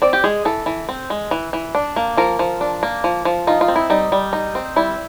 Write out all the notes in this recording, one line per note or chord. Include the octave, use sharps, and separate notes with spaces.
C4 D5
G4
G#3 G#4
E3 A4
E3
C4
G#3
E3
E3
D4
A#3
F3 A#4
F3
D4
A#3
F3
F3
D#4 F4
F4
C4
E4
G3 D#4
G3
D#4
C4
G3 E4